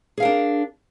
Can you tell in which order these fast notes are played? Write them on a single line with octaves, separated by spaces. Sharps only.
G#4 F5 A#4 D4